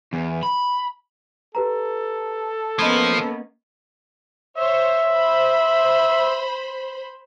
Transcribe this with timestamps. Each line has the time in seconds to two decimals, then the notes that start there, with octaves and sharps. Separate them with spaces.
0.13 E2
0.43 B5
1.55 G4 A4 B4 A#5
2.79 F3 A#3 B3 C#4 D#5 B5 G#6
4.57 C5 C#5 E5
5.10 C5 B5